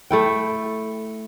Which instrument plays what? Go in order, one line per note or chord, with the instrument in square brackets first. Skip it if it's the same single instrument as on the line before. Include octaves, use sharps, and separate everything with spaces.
[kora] A3 E4 G5